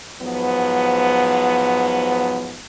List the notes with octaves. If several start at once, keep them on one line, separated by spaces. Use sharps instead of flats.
G#2 F3 F#3 B3